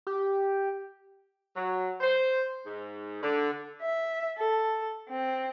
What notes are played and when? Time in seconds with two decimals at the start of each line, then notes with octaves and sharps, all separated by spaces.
0.07 G4
1.56 F#3
2.01 C5
2.66 G#2
3.22 D3
3.82 E5
4.38 A4
5.09 C4